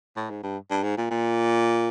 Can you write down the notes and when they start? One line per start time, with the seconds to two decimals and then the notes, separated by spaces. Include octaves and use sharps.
0.16 A2
0.30 G#2
0.43 G2
0.71 G2
0.83 G#2
0.97 A#2
1.10 A#2